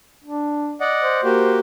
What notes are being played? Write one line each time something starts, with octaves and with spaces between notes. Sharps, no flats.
D4
D5 D#5 F#5
C5
A#3 F#4 G4